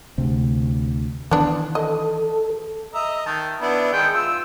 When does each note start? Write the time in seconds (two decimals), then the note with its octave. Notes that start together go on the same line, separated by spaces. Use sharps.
0.18 D2 C3 C4
1.31 D#3 E3 B3 D4
1.75 A4 D#5
2.94 D#5 E5 A#5
3.26 D#3 A5
3.61 B3 D4 E4
3.93 D#3 G#3 G5
4.14 F4 E6